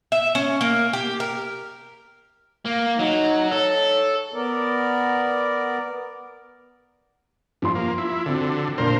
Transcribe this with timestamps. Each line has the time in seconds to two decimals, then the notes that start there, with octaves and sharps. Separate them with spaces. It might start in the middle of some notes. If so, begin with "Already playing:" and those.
0.12 E5
0.35 C#4
0.61 A#3
0.93 G4
1.20 A#4
2.65 A#3
2.99 F#3 D#4
3.52 A4 C#5
4.34 B3 A#4 D5
7.62 G2 F3 C6
7.75 A#3
7.98 E4
8.26 D3 C4 F#4
8.78 A#2 A#3 D4 A#4 C5